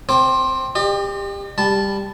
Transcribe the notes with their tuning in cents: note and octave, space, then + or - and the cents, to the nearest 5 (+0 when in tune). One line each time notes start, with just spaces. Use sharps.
C4 -10 C5 +20 D6 +10
G4 +25 D#5 -45
G3 +15 A5 -10